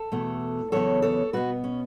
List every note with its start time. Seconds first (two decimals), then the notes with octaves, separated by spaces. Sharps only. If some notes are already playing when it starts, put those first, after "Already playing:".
Already playing: A4
0.12 E2 B2 A3
0.72 E2 C#3 F#3 B3 A4 C#5
1.02 A4 C#5
1.33 B2 B3 F#4 B4
1.64 C#4